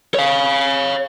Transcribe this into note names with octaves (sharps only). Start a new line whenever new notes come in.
C#5 F5